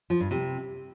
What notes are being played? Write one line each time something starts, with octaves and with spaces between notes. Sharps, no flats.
F3
G2
C3